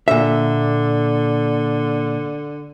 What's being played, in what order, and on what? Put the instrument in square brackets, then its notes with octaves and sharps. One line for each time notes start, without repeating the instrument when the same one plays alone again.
[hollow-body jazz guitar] A#2 E5 [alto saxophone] D3